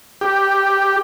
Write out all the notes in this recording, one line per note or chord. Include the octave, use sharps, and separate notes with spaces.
G4